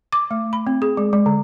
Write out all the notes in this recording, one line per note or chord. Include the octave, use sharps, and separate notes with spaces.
D6
A3
B5
C4
G#4
G#3
G#3
D3